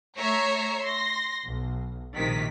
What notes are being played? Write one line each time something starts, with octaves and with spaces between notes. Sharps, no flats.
A3 C#5 E5 A#5 C7
C6 A#6
B1
A#1 C3 D#3 B6